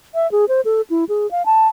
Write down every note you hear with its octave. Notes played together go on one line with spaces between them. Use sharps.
E5
G#4
C5
A4
E4
G#4
F5
A5